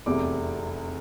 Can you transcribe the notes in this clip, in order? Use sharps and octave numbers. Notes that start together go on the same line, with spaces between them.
F1 E2 C3 D6